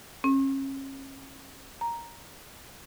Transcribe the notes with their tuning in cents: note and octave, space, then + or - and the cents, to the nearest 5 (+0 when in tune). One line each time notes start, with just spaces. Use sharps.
C#4 -35
A#5 +5